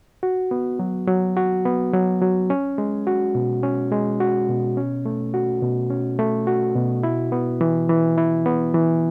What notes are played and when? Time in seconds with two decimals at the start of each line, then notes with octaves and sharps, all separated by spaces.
0.23 F#4
0.51 B3
0.79 F#3
1.08 F#3
1.36 F#4
1.65 B3
1.93 F#3
2.21 F#3
2.50 C#4
2.78 G#3
3.07 F#4
3.35 B2
3.63 C#4
3.92 G#3
4.20 F#4
4.49 B2
4.77 C#4
5.06 A3
5.34 F#4
5.62 B2
5.90 C#4
6.19 A3
6.47 F#4
6.76 B2
7.03 E4
7.32 B3
7.61 E3
7.89 E3
8.17 E4
8.46 B3
8.74 E3